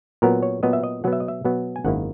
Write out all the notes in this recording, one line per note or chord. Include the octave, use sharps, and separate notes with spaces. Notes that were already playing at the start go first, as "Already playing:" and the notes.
A#2 F#3 B3 A#4
C#5
A#2 F#3 B3 D#5
E5
D#5
B2 F#3 B3 F#5
E5
D#5
E5
B2 F#3 B3
G#5
G#1 F#2 D#3 A#3 E4 F#5